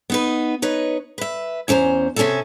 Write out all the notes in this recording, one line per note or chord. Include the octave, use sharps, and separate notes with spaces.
B3 D#4 B4
D#4 B4 C#5 D#5
B4 E5
E2 C#4 C5 A5 A#5
C3 C#4 D#4 G#4 A4 E5